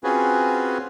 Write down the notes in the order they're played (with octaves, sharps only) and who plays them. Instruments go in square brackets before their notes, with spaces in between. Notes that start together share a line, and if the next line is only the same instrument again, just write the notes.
[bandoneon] C4 C#4 F4 F#4 G#4 B4